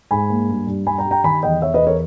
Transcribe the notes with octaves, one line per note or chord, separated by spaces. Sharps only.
G#2 G#5 B5
A#3
G2
G2
G2 G#5 B5
G5 A#5
G3
G5 A#5
D#3 G#5 B5
E2 D#5 G5
E2 C#5 E5
B4 D#5
E2
A#4 C#5